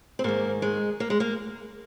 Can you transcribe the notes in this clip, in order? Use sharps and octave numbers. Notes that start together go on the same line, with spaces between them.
C4
G#2 D#3 A#3
G#3
A#3
G#3
A#3